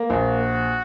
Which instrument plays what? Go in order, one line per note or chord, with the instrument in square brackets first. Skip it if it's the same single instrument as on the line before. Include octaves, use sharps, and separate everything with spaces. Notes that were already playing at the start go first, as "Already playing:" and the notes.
Already playing: [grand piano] A#3
[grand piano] A#1 [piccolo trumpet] F#4